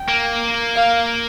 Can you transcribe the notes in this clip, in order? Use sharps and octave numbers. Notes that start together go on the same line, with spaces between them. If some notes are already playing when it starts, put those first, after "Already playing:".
Already playing: G5
A#3
F5